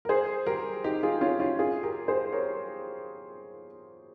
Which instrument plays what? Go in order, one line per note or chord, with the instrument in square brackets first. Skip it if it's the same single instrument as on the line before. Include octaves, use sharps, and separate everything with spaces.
[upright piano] A#4
G#4 C5
G4 A#4
D#4 G4
F4 G#4
C#4 F4
C#4 F4
F4 G#4
G4 A#4
G#4 C5
A#4 C#5